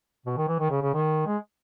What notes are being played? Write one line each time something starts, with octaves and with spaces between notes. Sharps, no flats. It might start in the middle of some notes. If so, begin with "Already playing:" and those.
B2
D#3
E3
D#3
C#3
C#3
D#3
G#3